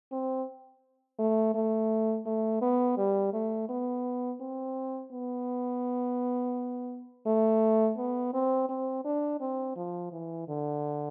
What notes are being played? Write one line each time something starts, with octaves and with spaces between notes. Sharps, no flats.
C4
A3
A3
A3
B3
G3
A3
B3
C4
B3
A3
B3
C4
C4
D4
C4
F3
E3
D3